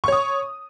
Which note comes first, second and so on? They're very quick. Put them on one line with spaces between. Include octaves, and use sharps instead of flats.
C#6 C#5 D#6